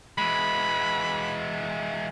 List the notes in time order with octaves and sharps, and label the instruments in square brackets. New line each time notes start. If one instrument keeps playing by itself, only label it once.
[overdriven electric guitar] E3 G#3 [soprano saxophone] B5